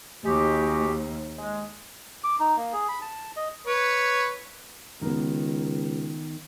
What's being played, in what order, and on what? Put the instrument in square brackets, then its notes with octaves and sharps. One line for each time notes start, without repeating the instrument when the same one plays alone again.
[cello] D#2 [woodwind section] G#3 F#4 G4
[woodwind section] G#3
[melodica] D6
D#4
A#3
G#4
B5
A5
D#5
[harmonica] B4 C#5
[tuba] C#2 [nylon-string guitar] D#3 B3